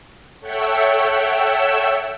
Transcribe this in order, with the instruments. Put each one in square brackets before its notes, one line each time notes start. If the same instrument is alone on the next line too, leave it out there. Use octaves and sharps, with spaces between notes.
[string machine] A4 C#5 E5 F#5 G5 E6